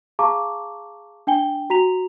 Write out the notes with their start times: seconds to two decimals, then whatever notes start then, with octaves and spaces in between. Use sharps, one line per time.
0.19 G#4 F5 A5 A#5 C#6 D6
1.27 D4 G5 G#5 G7
1.70 F#4 A#5 B6 F7